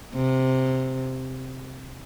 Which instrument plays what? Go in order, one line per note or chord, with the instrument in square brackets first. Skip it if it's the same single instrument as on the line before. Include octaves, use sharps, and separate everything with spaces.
[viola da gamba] C3